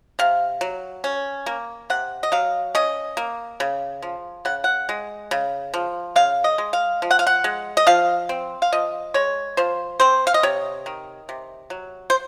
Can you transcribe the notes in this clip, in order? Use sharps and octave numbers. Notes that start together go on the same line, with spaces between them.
C3 F5
F#3
C#4
A#3
C3 F#5
D#5
F#3 F5
C#4 D#5
A#3
C#3
F3
C#3 F#5
F#5
G#3
C#3
F3
C#3 F5
D#5
G#3
F5
F3
F#5
F5
F#5
G#3
D#5
F3 F5
C4
F5
F3 D#5
G#3 C#5
F3 C5
C4 C5
F5
D#5
C3 C#5
D#3
C3
F#3
C5